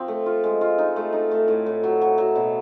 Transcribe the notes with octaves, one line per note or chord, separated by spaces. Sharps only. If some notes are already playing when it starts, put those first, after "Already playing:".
Already playing: F3 C4
A3
F4
G#3
F4
D#4
A3
D#4
A3
A2
A2
F#3
F#3
F#3
B2